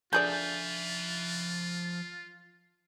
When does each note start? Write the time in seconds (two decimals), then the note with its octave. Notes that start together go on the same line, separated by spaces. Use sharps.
0.13 D3 F3 F4 G#4 D5 E5 G6